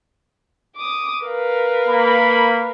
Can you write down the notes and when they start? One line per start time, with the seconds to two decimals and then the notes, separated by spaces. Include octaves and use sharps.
0.76 D6 D#6
1.26 A#4 B4 F5
1.89 A#3 B5